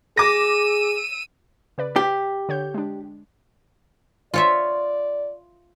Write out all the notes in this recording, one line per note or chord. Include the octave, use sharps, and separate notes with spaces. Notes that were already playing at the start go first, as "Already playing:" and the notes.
G#4 D6 E6 A#6 D#7
C#3 B4 D5
G4 B6
D3 C#5 G6
G#3 D4
F4 C#5 D5 E5